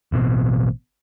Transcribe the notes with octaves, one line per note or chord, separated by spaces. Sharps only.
A1 B2 D3 C4